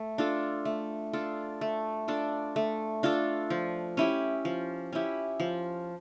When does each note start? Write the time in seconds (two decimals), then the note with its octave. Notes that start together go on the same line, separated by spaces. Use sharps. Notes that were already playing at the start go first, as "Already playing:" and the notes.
Already playing: A3
0.18 D4 F4 A4
0.65 A3
1.13 D4 F4 A4
1.61 A3
2.08 D4 F4 A4
2.56 A3
3.03 D4 F4 A4
3.50 F3
3.97 C#4 E4 G4
4.45 F3
4.92 C#4 E4 G4
5.40 F3